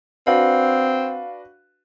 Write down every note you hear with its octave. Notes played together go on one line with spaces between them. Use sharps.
C4 D4 F#4 B4 F5